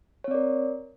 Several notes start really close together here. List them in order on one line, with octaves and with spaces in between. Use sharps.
C#5 C4 D5 A#4